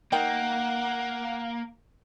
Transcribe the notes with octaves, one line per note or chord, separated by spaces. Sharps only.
D#3 A#3 F#5 G5